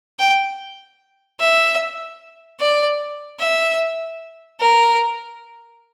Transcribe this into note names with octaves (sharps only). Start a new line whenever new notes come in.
G5
E5
D5
E5
A#4